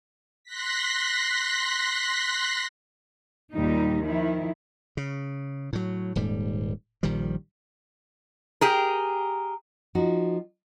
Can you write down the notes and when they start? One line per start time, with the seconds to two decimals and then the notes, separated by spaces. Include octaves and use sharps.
0.44 C6 F#6 A#6 B6
3.53 D#2 A#2 G3 D#4
4.02 D#3 F3 E4
4.97 C#3
5.73 A2 F#3
6.15 D#1 G#2 G3
7.03 A#1 D#3 F3 G3
8.61 G4 G#4 A#4
9.95 F3 D#4 F#4